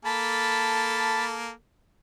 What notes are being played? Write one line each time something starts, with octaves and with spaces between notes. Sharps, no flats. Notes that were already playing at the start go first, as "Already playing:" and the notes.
A#3 A4 A5 B5